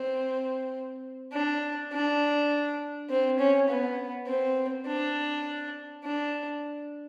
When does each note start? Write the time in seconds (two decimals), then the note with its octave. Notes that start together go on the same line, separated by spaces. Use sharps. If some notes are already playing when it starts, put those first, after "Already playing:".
Already playing: C4
1.33 D4
1.92 D4
3.10 C4
3.39 C#4
3.69 B3
4.27 C4
4.86 D4
6.04 D4